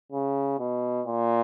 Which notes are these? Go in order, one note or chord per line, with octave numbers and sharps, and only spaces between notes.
C#3
B2
A#2